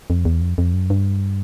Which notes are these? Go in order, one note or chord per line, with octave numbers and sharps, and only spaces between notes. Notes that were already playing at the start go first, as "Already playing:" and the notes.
F2
E2
F2
F2
F#2
G2